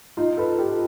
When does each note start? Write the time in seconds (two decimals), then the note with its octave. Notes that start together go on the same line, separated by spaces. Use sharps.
0.17 D#4 F4
0.37 A4 B4
0.58 G4 A4